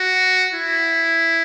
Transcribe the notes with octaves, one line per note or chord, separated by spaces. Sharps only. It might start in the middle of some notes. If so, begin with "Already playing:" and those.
Already playing: F#4
E4